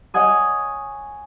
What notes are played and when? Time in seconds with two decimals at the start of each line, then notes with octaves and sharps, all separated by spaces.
0.14 C#5 D#5 F#5 G#5 D#6